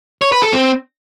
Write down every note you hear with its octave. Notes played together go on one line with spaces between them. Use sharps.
C#5
B4
A4
C4